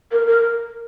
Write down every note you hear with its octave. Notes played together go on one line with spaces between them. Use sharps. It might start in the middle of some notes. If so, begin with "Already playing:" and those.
A#4
A#4